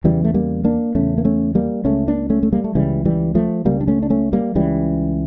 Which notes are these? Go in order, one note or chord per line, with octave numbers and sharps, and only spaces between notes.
E2 C#3 E3 G3
A3
G3 A#3
A#3 D4
E2 C#3 A3 C#4
A#3
A3 C#4
G3 A#3
C#2 C#3 A3 C#4
A#3 D4
A3 C#4
A3
G3 A#3
A3
C#2 C#3 E3 G3
E3 G3
F3 A3
C#2 C#3 G3 A#3
D4
A3 C#4
D4
A3 C#4
G3 A#3
C#2 C#3 E3 G3